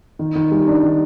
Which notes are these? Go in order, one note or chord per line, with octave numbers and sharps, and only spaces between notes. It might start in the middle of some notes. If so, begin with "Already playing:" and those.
D#3
D#3
G3
D4
D#3